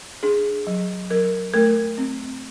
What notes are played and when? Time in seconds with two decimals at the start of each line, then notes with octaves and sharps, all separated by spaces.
0.23 D4 G#4
0.67 F#3
1.10 F#3 A#4
1.54 A3 A#4
1.98 C4